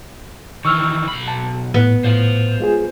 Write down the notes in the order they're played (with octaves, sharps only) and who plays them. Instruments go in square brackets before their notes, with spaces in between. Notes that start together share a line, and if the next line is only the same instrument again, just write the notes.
[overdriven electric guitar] D#3 E3 [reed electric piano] C#6 E6 F6
[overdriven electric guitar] B1 B5
[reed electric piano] A5
[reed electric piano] A2 [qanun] B3
[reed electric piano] A2 [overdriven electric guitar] C5 F5
[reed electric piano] G#3 F4 G#4